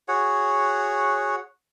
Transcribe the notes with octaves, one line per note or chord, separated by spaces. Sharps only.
F#4 G#4 C#5 F#5